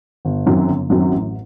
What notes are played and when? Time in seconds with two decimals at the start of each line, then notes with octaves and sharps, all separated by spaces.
0.25 G1
0.46 F#2 D#3 F#3 C4
0.68 G1
0.90 F#2 D#3 F#3 C4
1.12 A1